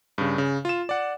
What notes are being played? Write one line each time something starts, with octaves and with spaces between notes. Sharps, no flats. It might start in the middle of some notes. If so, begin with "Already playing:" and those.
G2 C#3
C#3
F4 E7
D5 F#5